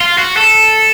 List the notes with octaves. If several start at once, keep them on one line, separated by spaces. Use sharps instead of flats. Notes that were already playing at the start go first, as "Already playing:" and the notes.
F4
F#4
A4